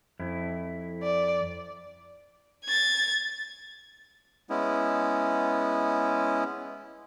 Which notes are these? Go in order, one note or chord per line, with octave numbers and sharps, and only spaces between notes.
F2 E4
D5
G#6 A6
G#3 B3 C#4 E4